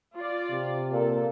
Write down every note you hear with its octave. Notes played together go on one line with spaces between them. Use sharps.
F4 D5
C3
A#2 A4